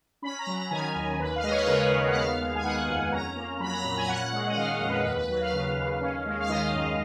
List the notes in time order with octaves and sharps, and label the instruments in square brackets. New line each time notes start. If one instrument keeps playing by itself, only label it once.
[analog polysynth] C#4 B5
A#5
F#3
A#5
D#3 G#5
D#2
D#2 B4
F5
G#3 D#5
C#5
B4
C#3 A#4
D#2
F#5
B3 F5
G#3
G#5
D#3 F#5
F2
C#4 A#5
A#3
F#3 B5
A#5
A#2 A#5
G#5
C#4 F#5
G#3
D#5
D#3 F5
D#5
F2
B4
D#2 B4
B4
F#3 B4
F5
C#3
D#2
C#4
G#3
F5
D#3 D#5
F#2